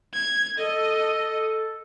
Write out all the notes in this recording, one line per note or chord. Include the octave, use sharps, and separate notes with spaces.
G#6
A4 D#5